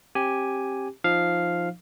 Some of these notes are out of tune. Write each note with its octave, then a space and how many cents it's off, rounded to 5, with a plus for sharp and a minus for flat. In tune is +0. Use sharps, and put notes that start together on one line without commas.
C4 +35 G4 +0 G#5 +0
F3 +0 D#4 +0 F5 +0